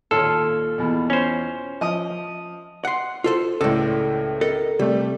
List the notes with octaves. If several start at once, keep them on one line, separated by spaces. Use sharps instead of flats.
D#2 A#2 F4 A4 C#5
E2 B2
C#4 C5
F3 D#5 D#6
F#5 C6
F4 A4 C5
C#2 A2 A4 D5
A4 A#4 D#5
C3 G3 A3